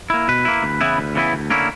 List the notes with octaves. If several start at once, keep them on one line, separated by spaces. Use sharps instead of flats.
A#3 E4
B2 B4
A#3 E4
D2
C#3 E3 B3 E4
D2
C#3 E3 B3 E4
D2
D3 A#3 C#4 E4